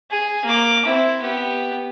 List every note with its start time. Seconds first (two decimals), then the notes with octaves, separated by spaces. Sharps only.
0.11 G#4
0.45 A#3 D6
0.85 C4 E4
1.22 B3 G4